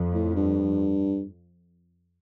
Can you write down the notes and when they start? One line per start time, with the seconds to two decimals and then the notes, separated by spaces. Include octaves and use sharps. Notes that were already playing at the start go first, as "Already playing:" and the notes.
Already playing: F2
0.14 A2
0.36 G2